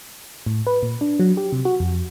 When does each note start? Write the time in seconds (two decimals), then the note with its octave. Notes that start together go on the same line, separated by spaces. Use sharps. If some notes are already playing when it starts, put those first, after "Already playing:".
0.46 A2
0.67 B4
0.83 A#2
1.01 D4
1.20 F#3
1.37 G4
1.52 C3
1.65 F#4
1.80 F2